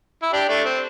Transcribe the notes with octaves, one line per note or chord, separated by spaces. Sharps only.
E4
D4 G4
A3 D4
C4